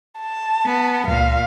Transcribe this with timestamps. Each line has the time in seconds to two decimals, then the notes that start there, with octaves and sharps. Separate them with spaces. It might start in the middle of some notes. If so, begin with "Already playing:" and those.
0.21 A5
0.66 B3
1.08 C#2 A#2 F5